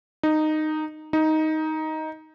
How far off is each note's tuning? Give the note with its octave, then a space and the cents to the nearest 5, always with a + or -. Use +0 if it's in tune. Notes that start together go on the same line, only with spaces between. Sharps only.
D#4 -10
D#4 +10